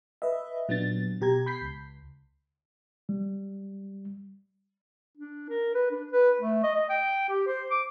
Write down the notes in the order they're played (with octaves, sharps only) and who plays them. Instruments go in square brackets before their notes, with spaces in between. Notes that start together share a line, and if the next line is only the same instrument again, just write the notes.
[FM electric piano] B4 D#5 E5
A#2 F#3 B3 D4 A6
B2 G4 A#5 G#6
B5 G6 B6 C7
C#2
[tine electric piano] G3
[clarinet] D4
A#4
B4
D4
B4
A3
D#5
D#5
G5
G4
C5
D6